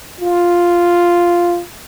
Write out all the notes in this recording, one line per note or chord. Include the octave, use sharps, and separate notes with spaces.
F4